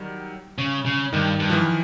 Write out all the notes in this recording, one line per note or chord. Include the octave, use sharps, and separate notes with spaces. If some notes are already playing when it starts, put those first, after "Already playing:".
Already playing: D#3 F#3 G3
C#3
C#3
G2 D#3
G2
F3
E3